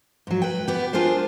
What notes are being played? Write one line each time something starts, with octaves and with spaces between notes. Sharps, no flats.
G#2 F#3
B4 G5
B3 G4
D4 F4 G#4 A#4 C5